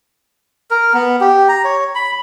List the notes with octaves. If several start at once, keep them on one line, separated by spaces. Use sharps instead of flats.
A#4
B3
G4
A#5
C#5
B5